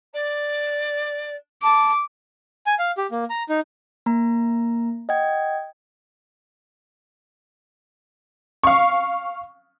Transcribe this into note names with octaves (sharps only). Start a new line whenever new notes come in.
D5
A5 D6
G#5
F5
G4
A#3
A#5
D#4
A#3 A#5
D#5 F#5 G5 G#6
F5 C#6